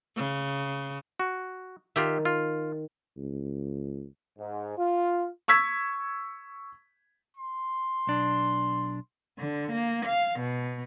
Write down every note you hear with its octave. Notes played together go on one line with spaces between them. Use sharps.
C#3
F#4
D#3 F4 G4 E5
F4
C#2
G#2
F4
C#6 E6 G#6 B6
C6
B1 D4
D3
A#3
F5
B2